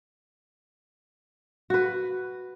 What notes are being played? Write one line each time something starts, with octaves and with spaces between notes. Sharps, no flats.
F#4 B4